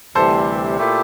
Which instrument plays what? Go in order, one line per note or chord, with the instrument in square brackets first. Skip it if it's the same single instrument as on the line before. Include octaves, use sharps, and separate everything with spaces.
[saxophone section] D2 C3 E3 G3 [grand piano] A4 C5
[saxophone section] A#2 A3 E4 G4